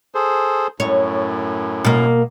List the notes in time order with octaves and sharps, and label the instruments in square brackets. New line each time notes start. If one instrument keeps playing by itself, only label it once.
[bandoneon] G#4 A4 C5
[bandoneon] F#2 A2 [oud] C#5
[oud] B2 A#3